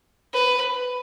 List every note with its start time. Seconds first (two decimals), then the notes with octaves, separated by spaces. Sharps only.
0.34 B4